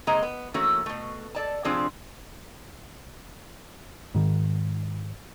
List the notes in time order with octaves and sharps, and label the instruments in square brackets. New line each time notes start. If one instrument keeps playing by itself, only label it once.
[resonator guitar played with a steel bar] C#3 G#3 A#3 C4 D#5 A#5
B3
E3 A3 A#3 C#4 F#4
B2 A3
A4 D5 A5
C3 F3 C4 D4 G#4
[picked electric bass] G#2 D#3